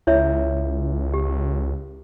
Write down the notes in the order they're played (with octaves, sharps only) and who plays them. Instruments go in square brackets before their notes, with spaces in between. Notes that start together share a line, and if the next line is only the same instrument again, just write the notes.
[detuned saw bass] C#2 [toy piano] E4 C#5 E5
[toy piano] G4